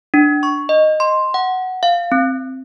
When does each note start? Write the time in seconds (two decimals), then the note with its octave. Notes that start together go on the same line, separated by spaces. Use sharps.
0.14 D4
0.43 C#6
0.69 D#5
1.00 C6
1.34 F#5
1.83 F5
2.12 C4